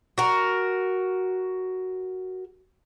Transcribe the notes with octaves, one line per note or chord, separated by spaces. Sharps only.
F#4 A#4